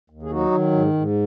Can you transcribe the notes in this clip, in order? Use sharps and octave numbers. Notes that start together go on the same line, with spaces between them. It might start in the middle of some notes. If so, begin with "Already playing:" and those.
D#2
G#4
F#3 D#4 F#4
D#3
G#2
G#2